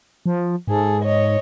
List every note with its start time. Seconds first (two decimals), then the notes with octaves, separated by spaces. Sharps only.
0.26 F3
0.68 G#2 G#4 A4
1.03 C#5 D#5